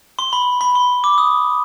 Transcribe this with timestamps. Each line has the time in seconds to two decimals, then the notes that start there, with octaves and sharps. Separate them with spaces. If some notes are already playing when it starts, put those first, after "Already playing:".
0.19 C6
0.33 B5
0.61 B5
0.75 C6
1.04 D6
1.18 D#6